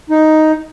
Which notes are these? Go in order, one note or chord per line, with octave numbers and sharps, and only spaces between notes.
D#4